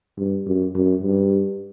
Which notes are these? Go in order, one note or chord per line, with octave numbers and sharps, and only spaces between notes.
G2
F#2
F#2
G2